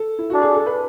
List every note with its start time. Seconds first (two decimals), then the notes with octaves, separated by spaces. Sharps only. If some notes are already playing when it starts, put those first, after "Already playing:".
Already playing: A4
0.18 E4
0.30 D4 F#4
0.42 G#4
0.54 A4
0.66 B4